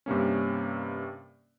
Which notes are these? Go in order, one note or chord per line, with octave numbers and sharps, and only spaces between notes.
G2 C3 A#3 C#4